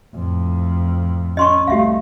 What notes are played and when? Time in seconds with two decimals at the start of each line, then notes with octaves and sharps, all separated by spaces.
0.15 F2 A2
1.37 C#4 D#5 C6 C#6
1.67 C2 A3 G4 E5 F5